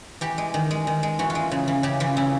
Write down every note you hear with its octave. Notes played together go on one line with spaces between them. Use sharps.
E3 G4
G#3
D#3
G#3
D#3
G#3
E3 F#4
F4
G#3
C#3
E3
C#3 G4
E3 F4
C#3 E4